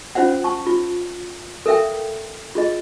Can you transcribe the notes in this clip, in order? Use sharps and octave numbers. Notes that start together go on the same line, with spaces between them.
C#4 F4 C5 F5 F#5
A5 C#6
F4
A4 A#4 E5 F5 G5
F4 G#4 D#5